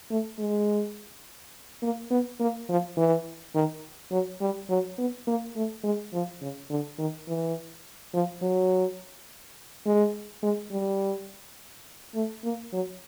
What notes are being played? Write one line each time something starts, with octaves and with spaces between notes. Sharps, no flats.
A3
G#3
A#3
B3
A#3
F3
E3
D#3
F#3
G3
F#3
B3
A#3
A3
G#3
F3
C#3
D3
D#3
E3
F3
F#3
G#3
G#3
G3
A3
A#3
F#3